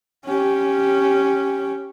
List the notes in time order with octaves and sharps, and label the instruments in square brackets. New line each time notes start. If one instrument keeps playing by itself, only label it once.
[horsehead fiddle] C#4 G4